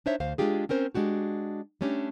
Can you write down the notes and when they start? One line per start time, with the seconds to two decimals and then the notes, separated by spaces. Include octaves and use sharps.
0.06 D4 D#4 C5 C#5 E5
0.20 D2 C5 F5
0.38 G#3 C4 D4 F4 G4 G#4
0.69 C4 C#4 A#4 C5
0.95 G#3 D4 F#4 G4
1.81 G3 A3 C#4 D4 G4